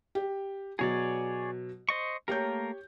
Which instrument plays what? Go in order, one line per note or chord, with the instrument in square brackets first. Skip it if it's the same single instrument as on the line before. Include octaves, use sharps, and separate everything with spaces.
[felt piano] G4
[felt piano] B2 F#3 [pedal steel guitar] G#4 C#5 D5
[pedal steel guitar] C5 D#5 C#6
[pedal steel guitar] A3 A#3 A#4 [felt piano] G4 C#5 G6